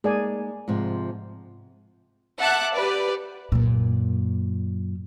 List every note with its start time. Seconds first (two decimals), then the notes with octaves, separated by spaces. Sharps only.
0.04 G#3 A#3 D#4 G#4 D5 G#5
0.68 G#2 C3 F3
2.39 E5 F#5 A5 D6 F#6
2.75 G4 B4 D5
3.52 F#2 A#2